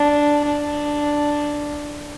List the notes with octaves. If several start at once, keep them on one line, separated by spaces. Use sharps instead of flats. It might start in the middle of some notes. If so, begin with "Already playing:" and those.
Already playing: D4
D4